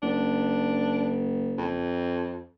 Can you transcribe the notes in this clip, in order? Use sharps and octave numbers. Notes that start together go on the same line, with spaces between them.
F#1 D4
F2